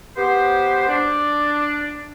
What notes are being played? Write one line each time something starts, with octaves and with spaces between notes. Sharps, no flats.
B3 G4 B4 C5
D4